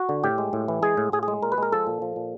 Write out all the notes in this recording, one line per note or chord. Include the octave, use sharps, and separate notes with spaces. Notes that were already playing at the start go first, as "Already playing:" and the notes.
Already playing: F#4
D3
A2 G4
G#3
A2
E3
G#3 G#4
A2
A2 G#4
G#4
G#3
A#2 A#4
B4
G#3 A#4
F3 A4
A#2
F3
A#2